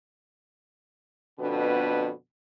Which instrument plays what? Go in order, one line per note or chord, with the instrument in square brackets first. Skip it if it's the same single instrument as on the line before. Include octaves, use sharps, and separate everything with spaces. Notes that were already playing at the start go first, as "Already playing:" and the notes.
[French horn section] F2 B2 D3 B3 D4 B4